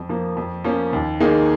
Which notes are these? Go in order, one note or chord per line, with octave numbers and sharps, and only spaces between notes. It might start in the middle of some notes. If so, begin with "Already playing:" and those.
Already playing: F2
F3 A#3
F2
F3 A#3 C#4
D#2
D#3 A#3 D#4 G#4